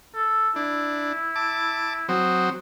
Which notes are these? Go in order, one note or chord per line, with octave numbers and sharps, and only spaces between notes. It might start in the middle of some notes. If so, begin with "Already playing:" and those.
A4
D4 E4
A5 D6
F#3 C4 D#6